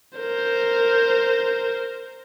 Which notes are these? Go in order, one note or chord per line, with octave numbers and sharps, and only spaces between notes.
A#4 C5